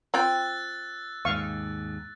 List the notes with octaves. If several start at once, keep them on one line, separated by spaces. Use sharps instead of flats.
C4 F4 G5 E6 F#6 A6
D#2 G#2 F5 C#6